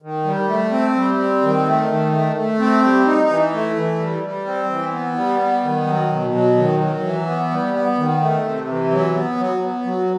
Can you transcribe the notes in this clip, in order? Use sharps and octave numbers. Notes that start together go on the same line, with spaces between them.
D#3
G3
A3
C4
G3
C4
D#3
A3
D#3
A3
A3
C4
G3
D#4
E3
A3
E3
G3
G3
C4
E3
B3
G3
B3
D#3
F#3
B2
F#3
D#3
F#3
E3
B3
G3
B3
D#3
A3
C3
E3
F#3
B3
F#3
B3
F#3